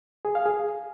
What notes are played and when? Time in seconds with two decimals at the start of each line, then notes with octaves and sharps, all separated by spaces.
0.25 G#4
0.35 F5
0.46 G#4